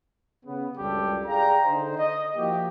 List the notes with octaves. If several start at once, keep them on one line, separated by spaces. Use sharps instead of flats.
C#3 B3
C#2 F#2 G3 D4 G4 A4
G#4 D5 F5 G5 A#5
D3 D#4 C5
D#5
F3 A#3 E4 F#4 G4